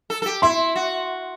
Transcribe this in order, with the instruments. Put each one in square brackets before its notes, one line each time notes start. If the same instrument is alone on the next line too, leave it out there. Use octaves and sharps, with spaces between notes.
[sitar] A4
A4
G4
[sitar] E4 [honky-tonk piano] C6
[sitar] F#4